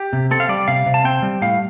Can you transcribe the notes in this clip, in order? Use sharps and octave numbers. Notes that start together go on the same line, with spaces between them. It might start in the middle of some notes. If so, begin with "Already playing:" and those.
Already playing: G4
C3
C4 A4
F5
G3 D5
C3 F5
C3
A5
C4 G5
G3
A2 F5